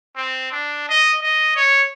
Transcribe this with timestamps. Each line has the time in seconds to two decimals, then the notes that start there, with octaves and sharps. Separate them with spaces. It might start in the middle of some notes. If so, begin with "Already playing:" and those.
0.16 C4
0.52 D4
0.89 D#5
1.22 D#5
1.56 C#5